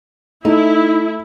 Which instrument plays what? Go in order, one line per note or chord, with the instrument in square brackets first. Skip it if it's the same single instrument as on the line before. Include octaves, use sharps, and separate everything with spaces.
[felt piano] A3 [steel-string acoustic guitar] D#4 [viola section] E4